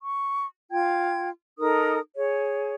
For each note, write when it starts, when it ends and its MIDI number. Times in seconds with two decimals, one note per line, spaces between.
0.01 0.46 85
0.71 1.29 65
0.71 1.29 79
0.71 1.29 92
1.58 1.98 63
1.58 1.98 69
1.58 1.98 70
1.58 1.98 87
2.16 2.75 68
2.16 2.75 73